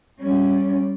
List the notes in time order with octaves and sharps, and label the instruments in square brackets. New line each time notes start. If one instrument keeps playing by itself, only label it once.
[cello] G3 C#4